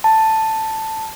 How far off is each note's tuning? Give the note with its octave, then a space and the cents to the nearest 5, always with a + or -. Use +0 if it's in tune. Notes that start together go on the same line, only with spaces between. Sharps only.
A5 +5